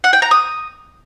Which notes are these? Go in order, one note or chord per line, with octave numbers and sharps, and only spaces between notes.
F#5
G5
A#5
D#6